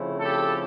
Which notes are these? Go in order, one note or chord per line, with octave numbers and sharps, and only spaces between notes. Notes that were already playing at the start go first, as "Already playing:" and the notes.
Already playing: C#3 F3 A3 C4 E4
G4 A4